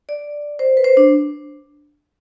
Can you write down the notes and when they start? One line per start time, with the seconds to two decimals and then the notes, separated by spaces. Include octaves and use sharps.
0.09 D5
0.59 C5
0.77 B4
0.84 C5
0.97 D4